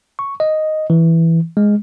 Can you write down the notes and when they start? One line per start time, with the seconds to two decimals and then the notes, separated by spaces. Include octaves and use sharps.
0.19 C#6
0.40 D#5
0.90 E3
1.57 G#3